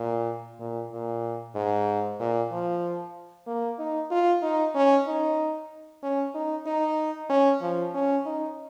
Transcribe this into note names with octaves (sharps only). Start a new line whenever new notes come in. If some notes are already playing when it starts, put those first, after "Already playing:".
Already playing: A#2
A#2
A#2
G#2
A#2
F3
A#3
D#4
F4
D#4
C#4
D#4
C#4
D#4
D#4
C#4
F3
C#4
D#4